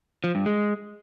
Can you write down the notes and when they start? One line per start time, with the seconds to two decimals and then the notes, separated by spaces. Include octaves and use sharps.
0.24 F3
0.35 G2
0.46 G#3